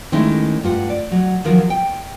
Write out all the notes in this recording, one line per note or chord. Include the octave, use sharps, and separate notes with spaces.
D#3 G#3 A3 C#4 D#4 E4
G2 F4 F#5
D5
F#3
D#3 F3 F#3 A#4
G5